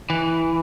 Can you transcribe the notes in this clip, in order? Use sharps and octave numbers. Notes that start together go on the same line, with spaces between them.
E3